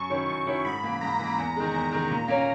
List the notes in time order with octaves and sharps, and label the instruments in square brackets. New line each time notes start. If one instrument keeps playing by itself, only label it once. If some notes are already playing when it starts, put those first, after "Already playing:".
Already playing: [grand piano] F#2 [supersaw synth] C#6
[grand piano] D#3 F#3 C#4 E4
[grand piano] F#2 [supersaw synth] C#6
[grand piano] D#3 F#3 C#4 E4
[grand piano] G#2 [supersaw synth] B5
[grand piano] E3 A#3
[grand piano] G#2 [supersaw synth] A#5
[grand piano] E3
A#3
E2
D#3 G#3
[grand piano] E2 [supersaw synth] A#5
[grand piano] D#3 G#3
A#2
A#3 C#4